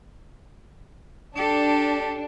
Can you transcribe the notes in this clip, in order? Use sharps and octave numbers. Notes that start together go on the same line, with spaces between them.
D4 G4 A4